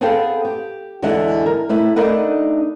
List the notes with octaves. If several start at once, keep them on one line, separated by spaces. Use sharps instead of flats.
B3 C4 G#4 A4 F5 G5
G4
E2 D3 E3 G#3 E4 F#5
A#4
A3 E4 B4
A3 D4 D#4 A#4 B4 F#5